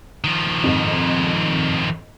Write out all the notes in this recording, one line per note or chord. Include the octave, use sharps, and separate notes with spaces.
D#3 F3
F2 G#2